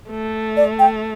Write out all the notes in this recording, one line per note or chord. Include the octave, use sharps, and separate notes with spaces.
A3
D5
G5